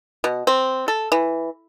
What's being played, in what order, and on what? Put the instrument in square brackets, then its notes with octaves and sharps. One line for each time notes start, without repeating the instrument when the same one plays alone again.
[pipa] B2
C4
A4
E3